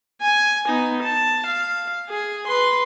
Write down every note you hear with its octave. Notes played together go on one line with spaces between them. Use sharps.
G#5
B3 D#4
A5
F5
G#4
B4 C6